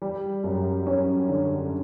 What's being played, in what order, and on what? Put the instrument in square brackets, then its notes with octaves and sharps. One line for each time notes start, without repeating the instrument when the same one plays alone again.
[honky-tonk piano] G3
F#2
C#4
D3